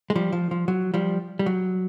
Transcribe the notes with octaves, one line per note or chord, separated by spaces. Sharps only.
G#3
F3 G3
F3
F3
F#3
F3 G3
G3
F#3